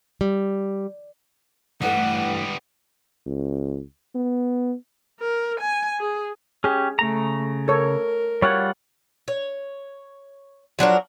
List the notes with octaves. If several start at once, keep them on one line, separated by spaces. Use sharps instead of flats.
G3
G2 E3 G3 A3 B3 F#5
C#2
B3
A#4
G#5
G#4
C#4 G4 G#4
C#3 A3 A#5
A4 A#4 C#5
G3 F4 C#5 F#5
C#5
F3 F#3 D4 A#4